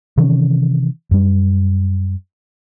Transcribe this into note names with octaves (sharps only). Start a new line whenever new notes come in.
C3 D#3 E3 C#4
F#2 G3